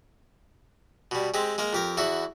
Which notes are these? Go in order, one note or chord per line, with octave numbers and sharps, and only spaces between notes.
B2 G3
G#3 C4 G4
G#3 A#3 A#4
F2 G4 A#4
E2 E4 F#4